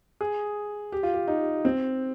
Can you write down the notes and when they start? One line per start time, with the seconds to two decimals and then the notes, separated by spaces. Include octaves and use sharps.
0.21 G#4
0.92 G4
1.03 F4
1.13 G4
1.28 D#4
1.65 C4